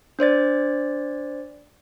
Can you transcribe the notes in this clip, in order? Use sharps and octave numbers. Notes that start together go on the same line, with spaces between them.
D4 C5 D5 A6